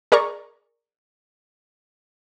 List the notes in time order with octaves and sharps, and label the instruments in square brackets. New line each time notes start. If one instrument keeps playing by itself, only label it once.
[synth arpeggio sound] G#4 A#4 D5 A#5 C#6